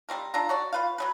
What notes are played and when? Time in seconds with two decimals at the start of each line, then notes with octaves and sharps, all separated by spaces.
0.09 G3 G#3 C4 A#4
0.34 D4 F4 E5 A#5
0.49 F#4 C#5 D5
0.73 F4 B4 F5
0.98 F#3 G3 B4